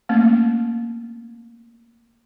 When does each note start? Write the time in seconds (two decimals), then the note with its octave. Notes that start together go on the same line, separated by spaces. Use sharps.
0.09 A3 A#3 C4 C#4